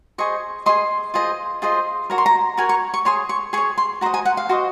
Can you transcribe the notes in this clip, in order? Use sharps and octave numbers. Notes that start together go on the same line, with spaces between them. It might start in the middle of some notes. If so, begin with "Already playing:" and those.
G#4 C5 D#5 C#6
G#4 C5 D#5 C6
F4 G#4 C5 D#5
F4 G#4 C5 D#5
F#4 A#4 C#5 A#5
C6
A#5
F#4 A#4 C#5 G#5
C#6
C#6
G#4 C#5 C6
C#6
G#4 C#5 C#6
C6
F#4 C5 D#5 A#5
G#5
F#5
F5
F#4 C5 D#5